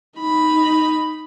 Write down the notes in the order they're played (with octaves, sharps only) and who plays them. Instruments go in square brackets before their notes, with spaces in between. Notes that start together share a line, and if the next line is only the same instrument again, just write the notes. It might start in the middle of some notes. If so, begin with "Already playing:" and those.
[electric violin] D#4 B5